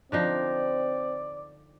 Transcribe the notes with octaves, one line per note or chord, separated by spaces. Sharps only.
D3 F3 C4 D#4 D5